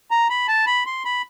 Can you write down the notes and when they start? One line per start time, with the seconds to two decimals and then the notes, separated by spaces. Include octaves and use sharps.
0.11 A#5
0.30 B5
0.48 A5
0.67 B5
0.86 C6
1.05 B5